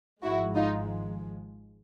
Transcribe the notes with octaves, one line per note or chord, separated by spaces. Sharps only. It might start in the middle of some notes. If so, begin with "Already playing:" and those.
G#1 G#2 F3 G#3 E4 F#4
D#4 F4